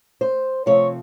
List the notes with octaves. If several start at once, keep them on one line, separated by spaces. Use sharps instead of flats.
C5
C3 F3 A3 C4 C#5